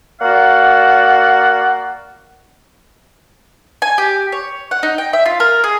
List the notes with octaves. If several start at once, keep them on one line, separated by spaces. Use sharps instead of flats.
A#3 F#4 D5 F5 F#5
G#5
G4
C#5
F#5
D#4
G5
E5
F4
A#4
G#4